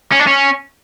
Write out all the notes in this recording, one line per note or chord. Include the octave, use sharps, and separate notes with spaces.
C#4
D4
C#4